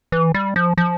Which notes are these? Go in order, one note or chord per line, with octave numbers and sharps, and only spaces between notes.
E3
G3
F3
F3